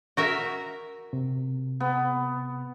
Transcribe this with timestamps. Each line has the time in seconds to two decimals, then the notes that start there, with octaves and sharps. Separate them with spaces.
0.17 F#4 A#4 E5
1.13 C3
1.80 B3